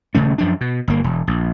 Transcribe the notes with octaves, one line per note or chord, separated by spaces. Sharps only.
D#1 C#3 A3 C#4
F#2 F3 D4
B2
G1 A#3
E1
A#1